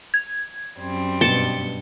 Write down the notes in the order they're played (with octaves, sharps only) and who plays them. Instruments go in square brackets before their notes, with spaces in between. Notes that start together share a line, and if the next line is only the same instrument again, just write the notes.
[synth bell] G#6
[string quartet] F#2 G3 C4
[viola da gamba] G2 B2 [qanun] A5 [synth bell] C#7 G7